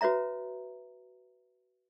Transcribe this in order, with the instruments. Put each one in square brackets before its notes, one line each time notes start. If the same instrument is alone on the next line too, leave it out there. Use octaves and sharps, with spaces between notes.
[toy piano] F#4 B4 C#5 E5 A#5